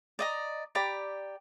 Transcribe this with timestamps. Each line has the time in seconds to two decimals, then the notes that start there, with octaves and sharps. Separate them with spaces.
0.19 D5 D#5 A#5
0.75 G4 D5 A#5 B5